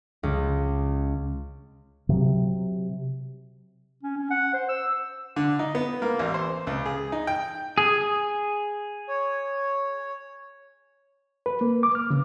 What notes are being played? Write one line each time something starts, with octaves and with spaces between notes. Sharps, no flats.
C#2
C3 F#3
C#4
C#4
F#5
C5
E6
D3
D#4
B3
A#3
A1
C5
C#2
G#4
D#4
G5
G#4
C#5
B4
A#3
D6
F6
C#3